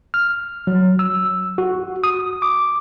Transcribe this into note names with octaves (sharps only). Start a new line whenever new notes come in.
F6
F#3
E6
F#4
D#6
D6